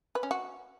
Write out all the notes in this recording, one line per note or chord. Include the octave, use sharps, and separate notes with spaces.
B4
C#4
F#4